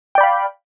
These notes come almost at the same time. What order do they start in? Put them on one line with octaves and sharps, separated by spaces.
G5 D5 B5 F5